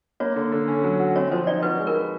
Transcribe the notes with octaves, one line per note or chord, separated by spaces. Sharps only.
A#3 C#5
D3
D3
C#4
F#3
F#4
C4 C#5
F3 C5
D#4 D5
F#4 B4
G#3
A#4
B4